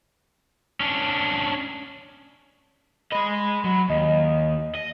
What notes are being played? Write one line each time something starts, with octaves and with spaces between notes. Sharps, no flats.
C#4 D4
G#3 D#5 B5
F#3
D#2 D#5
D#5